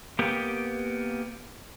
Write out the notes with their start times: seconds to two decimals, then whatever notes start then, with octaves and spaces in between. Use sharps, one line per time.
0.19 A#3 B3 G4